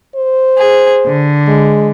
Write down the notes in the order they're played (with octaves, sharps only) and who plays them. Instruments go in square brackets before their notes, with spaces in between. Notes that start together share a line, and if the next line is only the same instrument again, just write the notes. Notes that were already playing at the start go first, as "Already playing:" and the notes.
[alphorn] C5
[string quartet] G#4
D3
[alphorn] G#3